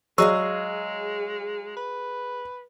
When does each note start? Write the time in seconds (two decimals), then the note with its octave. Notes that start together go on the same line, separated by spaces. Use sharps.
0.18 F#3 G#3 G#4 D#5 F5 C#6 E6
1.77 B4